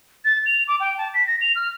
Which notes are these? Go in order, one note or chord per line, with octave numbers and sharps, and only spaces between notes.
A6
F7
D6
G5
A5
B6
A#6
F7
F6